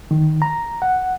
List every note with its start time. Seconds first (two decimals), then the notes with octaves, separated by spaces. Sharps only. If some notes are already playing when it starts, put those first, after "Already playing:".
0.11 D#3
0.42 A#5
0.82 F#5